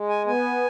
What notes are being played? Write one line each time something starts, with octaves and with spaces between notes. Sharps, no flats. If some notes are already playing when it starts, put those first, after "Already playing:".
Already playing: G#3
G#5
B3 G#5